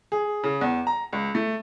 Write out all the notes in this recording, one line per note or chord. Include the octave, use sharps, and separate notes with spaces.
G#4
C#3
E2
A#5
C#2
A3